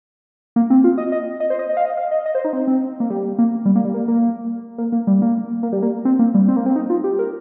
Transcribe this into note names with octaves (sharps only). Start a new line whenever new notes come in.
A#3
C4
F4
D#5
D#5
D#5
C5
D#5
D#5
F5
D#5
F5
D#5
D#5
C5
D#4
C4
C4
A#3
G3
A#3
G3
A#3
G3
A#3
A#3
A#3
A#3
G3
A#3
A#3
G3
A#3
C4
A#3
G3
C4
A#3
C4
D#4
F4
G4
A#4